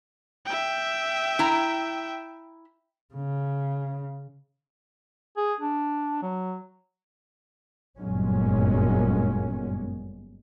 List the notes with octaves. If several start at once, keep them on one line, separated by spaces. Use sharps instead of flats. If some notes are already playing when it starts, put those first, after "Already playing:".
E5 G5
E4 A#5
C#3
G#4
D4
F#3
G1 F#2 A#2 F#3 G#3 C#4